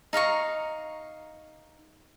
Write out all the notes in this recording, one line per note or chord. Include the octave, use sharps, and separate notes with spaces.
D#4 F5 A#5 C#6